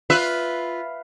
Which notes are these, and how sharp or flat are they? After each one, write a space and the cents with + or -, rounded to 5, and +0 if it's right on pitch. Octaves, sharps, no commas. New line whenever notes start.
F4 +0 B4 +0 E5 +0